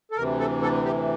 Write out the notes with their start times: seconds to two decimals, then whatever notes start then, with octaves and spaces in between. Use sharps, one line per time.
0.11 A4
0.16 D2 C3 E3 A#4
0.39 A4
0.62 A4
0.85 G4